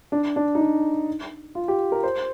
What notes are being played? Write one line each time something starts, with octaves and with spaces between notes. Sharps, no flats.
D4
D4
D#4
D4
F4
G4
A#4
C5